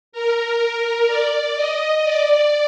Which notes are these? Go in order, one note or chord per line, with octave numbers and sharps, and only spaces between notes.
A#4
D5
D#5
D5